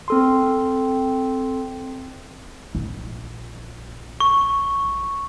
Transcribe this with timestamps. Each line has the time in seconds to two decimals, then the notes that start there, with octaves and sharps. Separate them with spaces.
0.08 C4 A4 C6
2.75 A#1
4.20 C#6